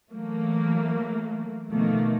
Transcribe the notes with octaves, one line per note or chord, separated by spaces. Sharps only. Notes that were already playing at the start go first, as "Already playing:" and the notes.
E3 F#3 A3 A#3
B2 D#3 F3 A3 A#3